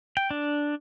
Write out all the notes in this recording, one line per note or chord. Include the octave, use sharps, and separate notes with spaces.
G5
D4